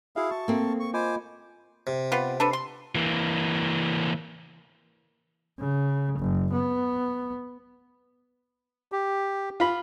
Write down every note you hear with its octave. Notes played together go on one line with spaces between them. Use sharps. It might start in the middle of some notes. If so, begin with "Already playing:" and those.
E4 F#4 G#4 E5 F5
A5 C#6
A#3 C4 A4
C#6
F4 C5 D#5 G#5 B5 D6
C3
B3 F4 G4
D4 A4 B4
C6
E3 A#3
C#3
F#1
B3
G4
F4 B5